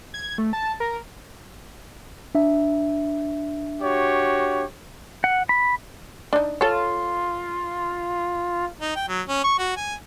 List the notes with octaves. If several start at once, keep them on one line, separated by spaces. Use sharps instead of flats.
G#6
A3
A5
A#4
D4 E5
F#4 G4 C#5
F#5
B5
D4 D#4
F4 A4 C#5
D#4
G5
F#3
C#4
C#6
F#4
G#5